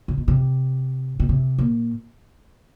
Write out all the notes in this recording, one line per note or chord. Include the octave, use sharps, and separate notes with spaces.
C3
B2
C3
B2
C3
A#2